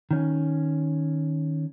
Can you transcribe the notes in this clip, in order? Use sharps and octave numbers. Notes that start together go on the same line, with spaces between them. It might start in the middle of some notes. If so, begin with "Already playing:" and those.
D#3 C#4